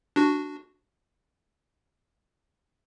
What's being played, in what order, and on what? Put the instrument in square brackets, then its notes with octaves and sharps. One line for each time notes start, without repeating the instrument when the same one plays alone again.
[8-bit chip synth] D4 F#4